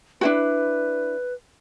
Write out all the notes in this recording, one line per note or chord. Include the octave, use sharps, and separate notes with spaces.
D4 E4 F#4 B4